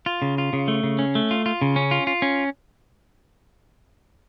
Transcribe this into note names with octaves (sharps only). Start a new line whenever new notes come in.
F4
C#3
F4
C#3
A3
C#3
C#4
A3
F4
F4
C#3
C#4
F4
F4
C#4